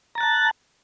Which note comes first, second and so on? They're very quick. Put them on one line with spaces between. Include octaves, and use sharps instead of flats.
A#5 A6 F#6 A5